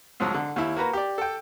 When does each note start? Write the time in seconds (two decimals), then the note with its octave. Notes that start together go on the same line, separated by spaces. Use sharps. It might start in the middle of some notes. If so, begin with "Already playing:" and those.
0.20 C#2 G#2 F3 F#3 E6
0.34 D3
0.56 D#2 E4
0.76 A#3 F#4 B4 A#5
0.93 G4 D5
1.18 A4 G5